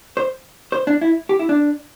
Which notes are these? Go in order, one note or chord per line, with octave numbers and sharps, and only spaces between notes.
C5
C5
D4
E4
G4
E4
D4